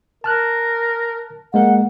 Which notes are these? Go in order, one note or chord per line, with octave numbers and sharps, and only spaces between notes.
A#4 A5 F6 F#6
G#3 A#3 A#4 F#5